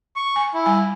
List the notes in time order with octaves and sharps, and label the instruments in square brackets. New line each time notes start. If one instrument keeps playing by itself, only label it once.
[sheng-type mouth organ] C#6
[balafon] G#5
[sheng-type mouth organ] E4
[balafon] G3 G#5